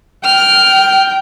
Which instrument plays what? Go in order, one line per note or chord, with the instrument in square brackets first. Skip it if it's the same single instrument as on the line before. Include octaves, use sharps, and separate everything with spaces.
[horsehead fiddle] G5 [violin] F6